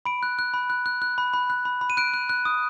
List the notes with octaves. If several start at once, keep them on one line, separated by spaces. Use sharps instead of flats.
B5 D7
F#6
F#6
B5
F#6
F#6
F#6
B5
B5
F#6
B5
B5
D#7
F#6 D7
F#6
F#6
D#6